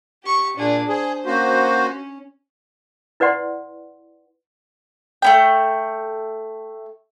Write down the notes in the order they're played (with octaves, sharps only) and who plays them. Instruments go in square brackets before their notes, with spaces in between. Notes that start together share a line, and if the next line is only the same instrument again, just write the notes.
[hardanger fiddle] G4 C#6
[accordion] A#2 [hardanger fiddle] D4 G#4
[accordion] G#4 [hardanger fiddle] C5
[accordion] A#3 F#4 C5 [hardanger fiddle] C#4
[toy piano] E4 B4 D5 F#5 C6
[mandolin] A3 B3 G5